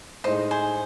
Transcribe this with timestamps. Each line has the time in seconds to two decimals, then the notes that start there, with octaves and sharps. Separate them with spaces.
0.24 A2 G#3 D#4 C5 D#5
0.51 G#4 C5